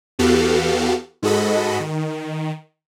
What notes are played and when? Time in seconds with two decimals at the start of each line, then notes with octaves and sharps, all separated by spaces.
0.19 E2 B3 F#4 G4 A4 F5
1.23 G#2 G#3 F#4 A4 D#5 B5
1.80 D#3